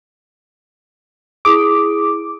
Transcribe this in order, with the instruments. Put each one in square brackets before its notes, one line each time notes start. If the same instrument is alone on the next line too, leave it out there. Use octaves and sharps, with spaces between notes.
[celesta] E4 G#4 D#6 [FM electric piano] D6